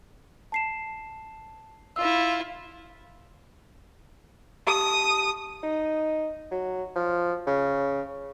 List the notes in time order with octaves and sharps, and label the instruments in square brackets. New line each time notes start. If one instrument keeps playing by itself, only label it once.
[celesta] A5 C7 E7
[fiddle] E4 F4 [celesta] E6
[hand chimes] G4 A5 [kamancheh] D#6
[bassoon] D#4
F#3
F3
C#3